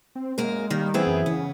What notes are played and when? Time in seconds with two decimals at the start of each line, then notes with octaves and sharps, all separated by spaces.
0.15 C4
0.38 F#2 G#3 A#3 A#4
0.70 D#3 G3 A#3
0.94 E3 B3 C4 E4 G#4
1.07 F#2
1.26 C#3 B3